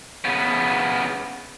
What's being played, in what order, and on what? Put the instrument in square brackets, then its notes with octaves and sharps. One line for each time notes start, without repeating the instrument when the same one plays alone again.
[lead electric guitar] C#3 B3